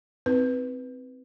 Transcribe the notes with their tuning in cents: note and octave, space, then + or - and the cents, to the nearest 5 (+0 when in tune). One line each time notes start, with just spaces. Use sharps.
C4 -10 D#4 +40 B4 +0